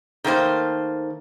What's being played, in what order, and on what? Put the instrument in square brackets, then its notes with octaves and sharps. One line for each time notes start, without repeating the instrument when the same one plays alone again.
[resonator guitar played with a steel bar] D#3 A3 A#3 C5